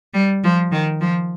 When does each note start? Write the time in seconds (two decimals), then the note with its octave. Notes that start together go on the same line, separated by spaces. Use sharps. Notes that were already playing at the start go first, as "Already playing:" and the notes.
0.14 G3
0.44 F3
0.72 D#3
1.01 F3